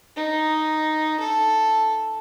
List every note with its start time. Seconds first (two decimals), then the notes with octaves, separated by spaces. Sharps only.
0.16 D#4
1.19 A4